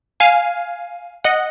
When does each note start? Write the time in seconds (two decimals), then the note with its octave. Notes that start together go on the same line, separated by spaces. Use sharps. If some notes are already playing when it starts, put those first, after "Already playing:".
0.20 F5 G#5
1.24 D#5 F#5